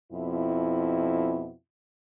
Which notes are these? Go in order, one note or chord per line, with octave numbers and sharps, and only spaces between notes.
F2 B2 E4